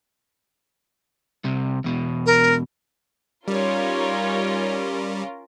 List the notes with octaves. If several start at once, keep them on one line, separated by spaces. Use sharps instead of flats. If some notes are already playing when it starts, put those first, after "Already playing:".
C2 C3
E2 B2
A#4
G3 C#4 D#4 F4 A#4 C#5